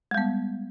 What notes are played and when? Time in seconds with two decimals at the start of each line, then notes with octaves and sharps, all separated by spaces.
0.11 G#3
0.14 G3
0.18 B3